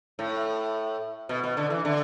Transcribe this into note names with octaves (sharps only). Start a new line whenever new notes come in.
A2
B2
B2
D3
E3
D3